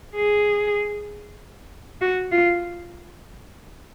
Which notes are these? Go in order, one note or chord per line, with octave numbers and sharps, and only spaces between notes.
G#4
F#4
F4